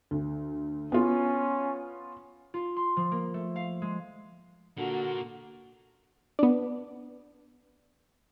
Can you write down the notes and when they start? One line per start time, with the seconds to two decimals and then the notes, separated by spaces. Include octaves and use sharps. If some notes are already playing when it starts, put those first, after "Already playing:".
0.11 D2
0.92 B3 C#4 F4
2.54 F4
2.77 C6
2.97 F3
3.12 A#3
3.34 A3
3.56 F5
3.82 G#3
4.78 A#2 D3 A#3 F#4
6.39 B3 D4